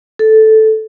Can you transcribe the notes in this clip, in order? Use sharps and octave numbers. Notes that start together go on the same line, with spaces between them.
A4